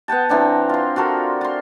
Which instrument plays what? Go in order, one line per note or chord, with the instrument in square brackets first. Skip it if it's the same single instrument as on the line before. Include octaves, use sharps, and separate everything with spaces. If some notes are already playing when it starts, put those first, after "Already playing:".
[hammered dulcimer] B3 F#5 G5 A5
E3 C4 D4 A#5
F4 C6
F4 F#4 A4 A#4
F4 C6